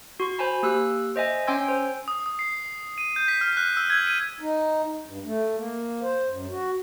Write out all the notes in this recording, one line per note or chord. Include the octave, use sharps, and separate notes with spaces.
F#4 C6 C#6
C5 G#5 A5 B5
A#3 G4 E6 F#6
C5 D#5 E5 G#5
C#4 G5 G#5 C6 E6 G#6
C5
D#6
D#6
C7
D#7
G6
B6
F6
F#6
E6
G#6
D#7
D#4
G2
A3
A#3
C5
F#2
F#4